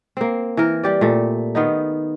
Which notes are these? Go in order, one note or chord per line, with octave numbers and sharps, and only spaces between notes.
A#3 C4
E3 A#4
G3 G4 D5
A#2 A3
D#3 B3 D#4